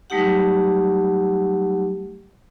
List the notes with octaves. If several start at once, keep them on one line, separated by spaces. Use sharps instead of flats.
F#3 G3 A3 D#4 G4 F#5